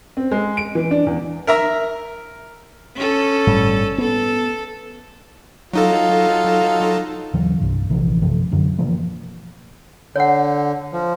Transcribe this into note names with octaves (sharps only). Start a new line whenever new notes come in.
C4
G#3
D7
E3
D4
E2
A#4 E5 A#5
C#4 A4
G1 A2 G3
B3 A4
F#3 D#4 F4 A4 F5
D#2 C#3 E3 F#3
C2 G2 C3
A#1 C3 E3 F3
F#2 C3 F3
F#2 D3 F#3
B2 E3 F3 A#3
D3 C#5 F#5
F3